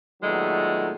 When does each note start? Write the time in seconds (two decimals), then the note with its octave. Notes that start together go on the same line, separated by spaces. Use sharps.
0.22 A#2 D#3 F#3 G#3 A3 B3